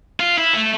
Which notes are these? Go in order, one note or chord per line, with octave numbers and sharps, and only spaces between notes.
F4
E4
A3